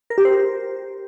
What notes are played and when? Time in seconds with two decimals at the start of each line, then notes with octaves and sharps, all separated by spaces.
0.10 A#4
0.18 G4
0.25 C5